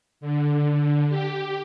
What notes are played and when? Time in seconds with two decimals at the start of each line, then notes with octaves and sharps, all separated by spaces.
0.21 D3
1.09 G4